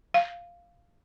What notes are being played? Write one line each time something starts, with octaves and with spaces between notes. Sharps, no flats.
F5